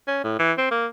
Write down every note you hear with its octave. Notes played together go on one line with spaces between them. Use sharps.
C#4
A2
E3
C4
A#3